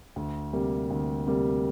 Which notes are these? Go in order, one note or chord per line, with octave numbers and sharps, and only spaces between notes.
D2
C3 G3 A#3
D2
C3 G3 A#3